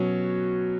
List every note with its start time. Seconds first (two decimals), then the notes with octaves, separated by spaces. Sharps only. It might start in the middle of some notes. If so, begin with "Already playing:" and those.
Already playing: B2 F#3 C#4